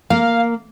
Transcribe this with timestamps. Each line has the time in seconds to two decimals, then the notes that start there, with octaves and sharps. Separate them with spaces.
0.10 A#3 F5